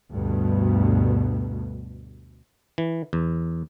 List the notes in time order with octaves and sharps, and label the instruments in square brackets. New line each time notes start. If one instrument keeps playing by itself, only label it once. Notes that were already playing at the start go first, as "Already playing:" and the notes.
[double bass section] D2 G2 B2
[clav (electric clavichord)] E3
E2